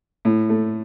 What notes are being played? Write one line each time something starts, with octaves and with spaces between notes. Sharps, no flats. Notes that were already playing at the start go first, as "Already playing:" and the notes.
A2
A3